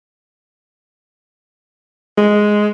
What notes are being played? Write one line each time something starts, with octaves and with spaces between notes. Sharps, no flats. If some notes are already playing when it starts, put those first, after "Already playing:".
G#3